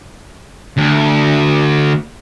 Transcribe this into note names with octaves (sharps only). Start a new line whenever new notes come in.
D2